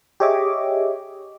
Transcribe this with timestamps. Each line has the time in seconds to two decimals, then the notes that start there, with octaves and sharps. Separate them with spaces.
0.20 G4 G#4 C#5 D#5 E5 D6